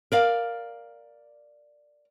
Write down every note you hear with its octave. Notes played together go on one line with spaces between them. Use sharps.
A#4 D5 F5